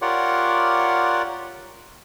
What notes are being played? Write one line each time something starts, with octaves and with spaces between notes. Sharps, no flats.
F4 G4 A#4 C#5 D5 F#5